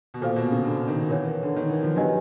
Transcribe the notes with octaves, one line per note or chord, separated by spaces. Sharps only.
B2
A#2 A4 C5 F5
B2
C#3
D3
D#3
E3 A#4 C#5 F#5
D3
D#3
E3
F3
F#3 D4 G4 B4 D#5 G#5